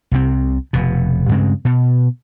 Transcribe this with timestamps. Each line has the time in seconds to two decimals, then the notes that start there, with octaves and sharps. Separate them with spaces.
0.11 C2 C3 C4
0.73 F1 B2
1.29 G2 C#3 G#3 C4
1.65 B2